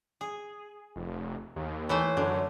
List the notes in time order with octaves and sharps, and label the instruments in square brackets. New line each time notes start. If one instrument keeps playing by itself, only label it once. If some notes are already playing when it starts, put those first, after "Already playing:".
[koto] G#4
[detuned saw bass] F1
D#2
[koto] E3 A3 C5 [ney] C#5
[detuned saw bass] F#2 [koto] D3